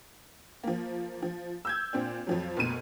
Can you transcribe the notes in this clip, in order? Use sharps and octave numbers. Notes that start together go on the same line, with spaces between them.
F3 A#3
F3
E6 G6 G#6
A#2 C4 D4
F2 F3 F#3
F#1 D2 B2 D#7